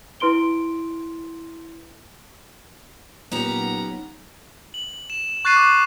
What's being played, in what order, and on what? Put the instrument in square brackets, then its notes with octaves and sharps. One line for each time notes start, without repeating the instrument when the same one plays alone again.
[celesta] E4 B4 C6 D7 G7
[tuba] A#2 [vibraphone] F#3 D#4 [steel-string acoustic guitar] B3 C#4 G4 [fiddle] A#5
[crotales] F#7
E7
C#6 F#6 A6 C7 D#7 E7
D6 F#6 C7